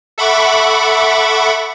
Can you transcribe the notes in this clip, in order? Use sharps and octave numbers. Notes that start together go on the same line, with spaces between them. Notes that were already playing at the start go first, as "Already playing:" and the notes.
A4 E5 F#5 B5 C#6 D6